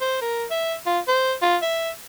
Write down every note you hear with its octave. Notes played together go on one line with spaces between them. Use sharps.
C5
A#4
E5
F4
C5
F4
E5